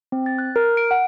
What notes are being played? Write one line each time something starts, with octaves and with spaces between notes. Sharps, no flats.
C4
A6
F#6
A#4
D7
F#5